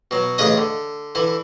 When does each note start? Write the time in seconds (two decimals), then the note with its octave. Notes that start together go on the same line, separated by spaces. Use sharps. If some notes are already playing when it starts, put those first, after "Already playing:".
0.11 B2 F#3
0.38 A1 C#3 B4 D#5 D#6
0.57 D3
1.15 D3 E3 E4